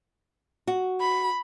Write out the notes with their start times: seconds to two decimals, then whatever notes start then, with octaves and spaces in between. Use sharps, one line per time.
0.67 F#4
1.01 B5